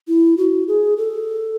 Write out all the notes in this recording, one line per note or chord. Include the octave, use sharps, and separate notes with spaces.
E4
F#4
G#4
A4